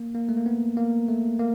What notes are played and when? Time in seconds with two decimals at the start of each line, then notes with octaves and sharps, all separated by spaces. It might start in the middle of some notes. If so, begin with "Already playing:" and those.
Already playing: A#3
0.15 A#3
0.29 A3
0.37 A#3
0.46 B3
0.77 A#3
1.08 A3
1.39 A#3